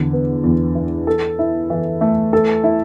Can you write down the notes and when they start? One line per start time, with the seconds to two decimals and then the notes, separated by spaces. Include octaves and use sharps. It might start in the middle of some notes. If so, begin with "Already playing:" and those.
Already playing: E2 D3
0.13 B3
0.43 E2
0.75 E3
1.07 A4
1.39 E4
1.70 E3
2.01 A3
2.33 A4
2.64 E4